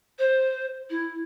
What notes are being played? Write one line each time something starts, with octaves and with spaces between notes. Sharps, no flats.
C5
E4